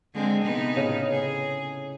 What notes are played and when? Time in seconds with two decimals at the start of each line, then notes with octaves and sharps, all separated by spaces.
0.13 D3 G#3 C4
0.44 C3 B3 D#4
0.76 A2 C#3
1.10 G#4